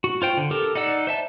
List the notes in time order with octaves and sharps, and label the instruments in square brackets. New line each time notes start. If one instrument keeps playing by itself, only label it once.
[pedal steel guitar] F#4
F4 C5 G5
D3
G4 A4 A#4
D#4 D5 F#5 E6
C5 E5 A5